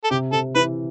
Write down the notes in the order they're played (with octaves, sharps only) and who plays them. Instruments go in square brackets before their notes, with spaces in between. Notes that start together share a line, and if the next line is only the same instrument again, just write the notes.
[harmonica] A4
[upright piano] C3 [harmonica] G4
[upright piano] C3 [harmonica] A4
[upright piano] E3 [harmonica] B4